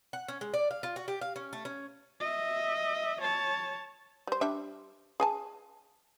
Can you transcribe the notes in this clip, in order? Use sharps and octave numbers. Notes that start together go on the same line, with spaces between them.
F#5
C#4
G#3
D5
F5
F4
F#4
G4
F5
C#4
A3
C#4
D#5 E5
C#5 A5
G3 C5
G3 D4 E5
G#4 G#5 A5